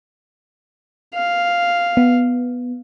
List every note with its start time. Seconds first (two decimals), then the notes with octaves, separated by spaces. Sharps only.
1.14 F5
1.97 B3